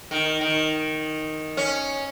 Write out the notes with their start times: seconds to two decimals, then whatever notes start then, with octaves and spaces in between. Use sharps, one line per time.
0.11 D#3
0.41 D#3
1.57 C#4